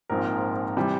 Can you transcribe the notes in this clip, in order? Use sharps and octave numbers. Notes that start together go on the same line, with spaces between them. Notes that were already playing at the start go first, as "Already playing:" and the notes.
A#1 G#2 F3 C4 A#4
C3 E3 G3